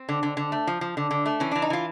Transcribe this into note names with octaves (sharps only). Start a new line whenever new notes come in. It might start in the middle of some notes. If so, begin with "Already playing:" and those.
Already playing: C4
D3
D3
D3
A3
F3
F3
D3
D3
A3
E3 C#4
E3 D4
D#4
E3 F4